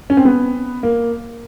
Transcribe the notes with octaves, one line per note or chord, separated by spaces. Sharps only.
C#4
C4
B3
A#3